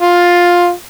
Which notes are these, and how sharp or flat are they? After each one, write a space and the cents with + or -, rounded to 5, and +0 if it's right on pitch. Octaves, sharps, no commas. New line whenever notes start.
F4 +10